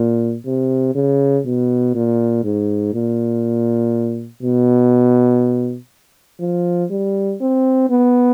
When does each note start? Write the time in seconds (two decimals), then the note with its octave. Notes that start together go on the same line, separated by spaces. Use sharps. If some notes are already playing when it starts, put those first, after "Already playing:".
Already playing: A#2
0.46 C3
0.95 C#3
1.45 B2
1.95 A#2
2.44 G#2
2.93 A#2
4.43 B2
6.40 F3
6.90 G3
7.40 C4
7.89 B3